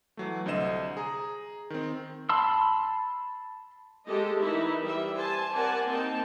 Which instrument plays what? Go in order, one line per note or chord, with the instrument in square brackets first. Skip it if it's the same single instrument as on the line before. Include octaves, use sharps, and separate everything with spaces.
[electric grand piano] E3 F#3 A3
C2 D3 C5 D#5 E7
G#4 A#5
D#3 C4
[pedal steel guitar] A5 B5 C6 E6
[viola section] G#3 A3 G4 A4 D#5
E3 D#4 E4 A#4 E5
E3 G3 E5
C5 G#5 A5
C4 A#4 D5 F#5 G#5 A5
A#3 C4 D#4 G5 A5